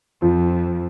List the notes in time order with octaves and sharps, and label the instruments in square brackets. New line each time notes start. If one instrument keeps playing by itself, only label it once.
[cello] F2 [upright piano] F3